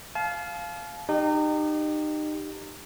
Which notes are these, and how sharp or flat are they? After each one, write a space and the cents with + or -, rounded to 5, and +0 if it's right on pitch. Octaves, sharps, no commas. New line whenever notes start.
F5 +0 A5 -40
D#4 -30 G4 +0